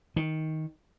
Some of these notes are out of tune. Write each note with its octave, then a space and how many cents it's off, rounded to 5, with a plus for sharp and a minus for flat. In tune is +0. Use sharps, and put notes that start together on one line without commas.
D#3 +10